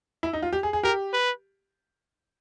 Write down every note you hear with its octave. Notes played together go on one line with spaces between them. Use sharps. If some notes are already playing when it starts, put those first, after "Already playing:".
E4
D#4
F4
G4
G#4
G#4
G4 A#4
B4